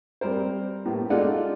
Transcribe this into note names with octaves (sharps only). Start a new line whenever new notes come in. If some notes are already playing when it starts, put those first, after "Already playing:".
G3 C4 A#4 C5
A2 A#3 B3 G4
G#3 D#4 F4 A4 D5 F#5